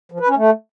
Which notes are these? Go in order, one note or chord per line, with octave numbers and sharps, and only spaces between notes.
F3
B4
C#4
A3